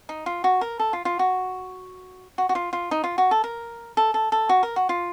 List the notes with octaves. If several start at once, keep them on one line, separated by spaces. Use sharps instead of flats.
D#4
F4
F#4
A#4
A4
F4
F4
F#4
F#4
F#4
F4
F4
D#4
F4
F#4
A4
A#4
A4
A4
A4
F#4
A#4
F#4
F4